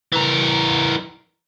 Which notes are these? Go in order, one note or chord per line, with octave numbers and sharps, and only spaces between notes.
E3 A#4